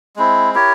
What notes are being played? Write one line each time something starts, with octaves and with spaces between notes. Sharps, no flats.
G#3 C4 E4
E4 G4 A#4 C#5